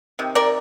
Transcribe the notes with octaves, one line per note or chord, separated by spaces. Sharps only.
C3 D#3
A#4 D5